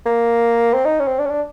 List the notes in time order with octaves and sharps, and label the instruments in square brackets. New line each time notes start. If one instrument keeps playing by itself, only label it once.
[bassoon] A#3
C4
D#4
C#4
C4
D4
C#4
D4